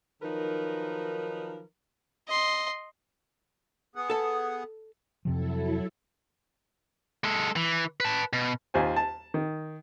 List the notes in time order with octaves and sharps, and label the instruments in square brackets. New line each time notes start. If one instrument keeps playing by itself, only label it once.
[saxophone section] D#3 F3 F#3 D#4 A#4 B4
[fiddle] D#5 C6
[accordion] B3 G#4 F#5
[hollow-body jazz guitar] A4 A5
[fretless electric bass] F2 C3 F3 [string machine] F#3 E4 A4
[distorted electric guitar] G#3 A4
E3
B4 A5
B2
[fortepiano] D#2 F4 C5 G#5
A5
D#3